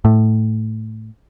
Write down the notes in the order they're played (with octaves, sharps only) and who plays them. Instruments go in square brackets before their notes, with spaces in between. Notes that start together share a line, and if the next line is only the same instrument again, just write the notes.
[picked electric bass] A2